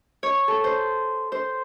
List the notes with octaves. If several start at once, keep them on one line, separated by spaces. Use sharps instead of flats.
C#5
A4
C5
C5